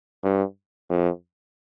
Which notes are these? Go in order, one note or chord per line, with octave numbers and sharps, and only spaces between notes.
G2
F2